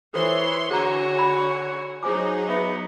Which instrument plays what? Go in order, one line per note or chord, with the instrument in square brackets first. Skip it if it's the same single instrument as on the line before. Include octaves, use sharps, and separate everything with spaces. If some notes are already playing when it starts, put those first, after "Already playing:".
[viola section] E3 C#5 C6 [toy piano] A4 C5
[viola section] D3 C#5 G#5 [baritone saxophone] F#4 [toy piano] G#4 A#5
[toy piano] B5
[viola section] F#3 D#4 G#4 [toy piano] C5 G#5 D6
[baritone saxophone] B3 [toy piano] E5